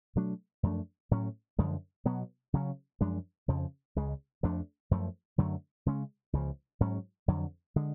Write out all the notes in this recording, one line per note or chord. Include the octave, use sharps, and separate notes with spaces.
B2 F#3 A3 D4
F#2 F3 A3 D4
A2 F#3 C#4
F#2 D3 F3 G#3
B2 F#3 B3
C#3 F#3 C#4
F#2 F3 G#3 D4
F2 C#3 F3
C#2 C#3 G#3
F2 F3 A3 D4
F#2 F3 A3
F#2 D3 F#3 A3
C#3 G#3 C#4
C#2 C#3 F3
G#2 F#3 C#4
F2 D3 F#3
D3 G#3